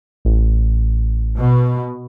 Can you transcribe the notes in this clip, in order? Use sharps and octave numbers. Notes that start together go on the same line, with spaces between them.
A1
B2